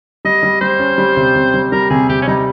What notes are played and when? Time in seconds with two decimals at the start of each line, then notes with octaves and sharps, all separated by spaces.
0.25 G3 D#5
0.43 G3
0.61 G3 C5
0.79 C#4
0.98 G3
1.17 C3
1.36 C3
1.54 G3
1.72 G3 A#4
1.90 C3 G#4
2.09 C3 G4
2.21 C#4
2.28 G3 D#4